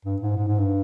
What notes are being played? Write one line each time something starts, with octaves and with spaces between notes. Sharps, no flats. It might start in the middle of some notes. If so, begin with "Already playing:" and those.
G2
G#2
G#2
G#2
G2